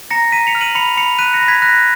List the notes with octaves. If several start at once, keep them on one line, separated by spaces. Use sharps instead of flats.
A#5 A#6 C#7
A#5 B6 D#7
C#7 F7
F6
D#7 F#7
B5 C#7 F7
B5 C#7 F7
F#6 B6 D#7
A#6 C#7
B5
G#6 B6
F#6 A#6